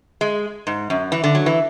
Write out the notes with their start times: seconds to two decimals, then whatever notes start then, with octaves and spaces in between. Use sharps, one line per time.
0.21 G#3
0.67 G#2
0.90 F#2
1.12 E3
1.24 D3
1.35 F#3
1.46 E3